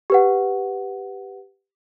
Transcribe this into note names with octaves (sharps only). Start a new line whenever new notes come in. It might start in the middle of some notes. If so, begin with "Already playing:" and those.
G4 B4 F#5